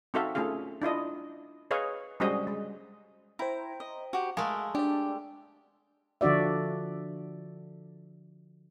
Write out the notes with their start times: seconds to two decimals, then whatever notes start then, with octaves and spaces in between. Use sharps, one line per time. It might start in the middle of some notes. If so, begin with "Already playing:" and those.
0.14 C4 D#4 F#4 A4 E5 F5
0.35 A3 C#4 F4 G#4 F5
0.82 D4 E4 F4 D#5
1.71 G#4 B4 C#5 D#5 F5
2.20 G3 G#3 C#4 F#4 C5 D#5
2.47 G#3
3.39 E4 C5 G5 A#5
3.80 D#5
4.13 F#4 G4
4.37 G#3 A3 A#4 F5
4.75 D4 G4 D5
6.21 D3 F3 D4 F#4 D5 E5